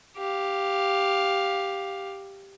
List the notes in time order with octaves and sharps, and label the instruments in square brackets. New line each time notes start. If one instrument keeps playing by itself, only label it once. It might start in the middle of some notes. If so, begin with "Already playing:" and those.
[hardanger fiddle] G4 F5